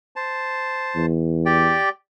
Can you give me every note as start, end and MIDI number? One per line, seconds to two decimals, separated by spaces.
0.16 1.06 72
0.16 1.06 81
0.96 1.78 40
1.46 1.89 67
1.46 1.89 74
1.46 1.89 79